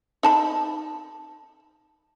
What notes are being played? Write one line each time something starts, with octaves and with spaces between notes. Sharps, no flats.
D#4 A5 B5